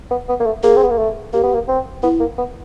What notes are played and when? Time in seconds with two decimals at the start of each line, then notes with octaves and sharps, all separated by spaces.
0.11 B3
0.29 B3
0.40 A#3
0.46 A3
0.63 A#3 G#4
0.77 C4
0.84 B3
0.90 A#3
0.98 A3
1.33 A#3 G4
1.43 B3
1.54 A#3
1.68 C4
2.03 B3 E4
2.20 A#3
2.38 B3